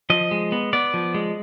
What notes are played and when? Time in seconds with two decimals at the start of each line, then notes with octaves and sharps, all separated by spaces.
0.10 F3 D#5
0.31 G#3
0.52 B3
0.73 B3 D5
0.94 F3
1.15 G#3